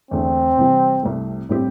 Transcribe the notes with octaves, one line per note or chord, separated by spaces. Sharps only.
E2 D3 A3 C4
C3 E3 G3
C2 C3 A3
A2 G3 C4 G4